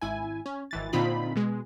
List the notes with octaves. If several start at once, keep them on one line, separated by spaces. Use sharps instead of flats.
G#1 E4 G#5
C#4
G#1 E3 A6
A#2 D3 C4 D#4 F4 B5
B2 G#3